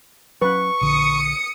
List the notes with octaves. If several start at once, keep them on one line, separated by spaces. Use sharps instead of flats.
F#3 C#4 B4 C#6
A#1 D3 D#6 C#7